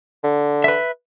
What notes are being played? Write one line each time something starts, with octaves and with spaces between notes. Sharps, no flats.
D3
B4 E5